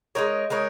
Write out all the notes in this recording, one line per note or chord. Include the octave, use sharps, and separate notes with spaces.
G#3 D#4 A#4 C#5
G#3 D#4 A#4 C#5